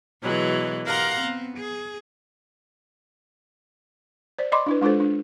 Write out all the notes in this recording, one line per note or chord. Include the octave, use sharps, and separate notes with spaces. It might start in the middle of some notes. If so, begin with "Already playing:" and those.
B2 E3 F#3 G#3
G4 A#4 F5 F#5 A#5 C6
B3 C4
G#4
C5 D5
D5 D#5 B5 C6 D6
D4 E4 B4
G#3 D4 F4 A4 C5
D4